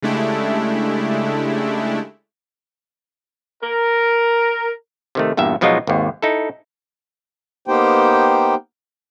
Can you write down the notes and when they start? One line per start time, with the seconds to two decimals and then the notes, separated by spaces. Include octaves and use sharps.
0.02 C#3 G#3 A3 D4 E4 G4
3.64 A#4
5.15 C3 D#3 A3
5.37 E2 G2 A#2 E5
5.61 B2 F3 F#3 G#3 D#4 F4
5.87 G#1 D#2
6.22 D#4 E4 A4
7.68 A#3 B3 D#4 G4 C5 G5